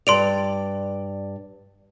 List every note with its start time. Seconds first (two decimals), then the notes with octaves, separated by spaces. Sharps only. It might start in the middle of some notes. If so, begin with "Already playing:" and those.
0.07 G2 D5 C6 D7 F7